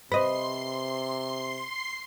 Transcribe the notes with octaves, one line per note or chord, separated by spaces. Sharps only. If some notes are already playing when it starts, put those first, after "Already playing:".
C3 B4 C5 D#5 B5 C6 C7